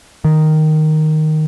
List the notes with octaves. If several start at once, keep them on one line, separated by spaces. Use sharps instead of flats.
D#3